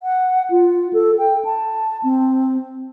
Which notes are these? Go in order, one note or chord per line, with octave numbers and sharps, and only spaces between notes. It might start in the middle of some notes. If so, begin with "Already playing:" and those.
F#5
F4
A4
G5
A5
C4